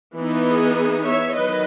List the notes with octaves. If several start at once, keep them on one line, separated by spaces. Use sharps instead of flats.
E3 B3 D#4
G#4
C#5 E5
D#3 F#3 B4 D#5